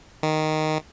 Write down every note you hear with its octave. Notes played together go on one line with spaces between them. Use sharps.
D#3